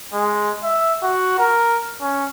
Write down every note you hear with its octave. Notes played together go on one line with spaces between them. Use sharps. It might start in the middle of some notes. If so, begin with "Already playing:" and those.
G#3
E5
F#4
A#4
C#4